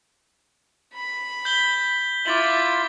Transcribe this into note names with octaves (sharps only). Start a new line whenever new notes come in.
B5
G6 B6 G7
E4 F4 D6 A6 F#7